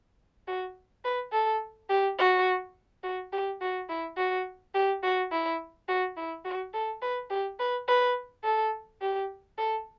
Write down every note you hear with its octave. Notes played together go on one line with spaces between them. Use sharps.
F#4
B4
A4
G4
F#4
F#4
G4
F#4
E4
F#4
G4
F#4
E4
F#4
E4
F#4
A4
B4
G4
B4
B4
A4
G4
A4